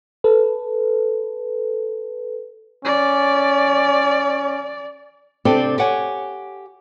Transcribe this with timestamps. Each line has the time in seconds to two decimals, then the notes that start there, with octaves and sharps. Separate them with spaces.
0.24 A4 B4
2.85 C#4 D5
5.45 C3 C4 D4 G4 A4 D5
5.78 G4 C#5 F#5 G#5